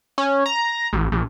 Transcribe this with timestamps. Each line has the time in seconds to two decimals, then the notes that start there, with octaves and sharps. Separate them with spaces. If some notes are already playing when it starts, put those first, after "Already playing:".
0.18 C#4
0.46 A#5
0.93 A1
1.12 A#1